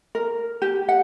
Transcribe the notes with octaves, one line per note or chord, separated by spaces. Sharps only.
A#4
G4
F#5